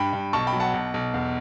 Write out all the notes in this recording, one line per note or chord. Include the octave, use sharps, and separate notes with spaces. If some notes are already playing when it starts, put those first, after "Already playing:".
Already playing: G2 G5 B5
G2
B1 A5 C#6
G5 B5
F#3
F#5 A5
B1
B1
E2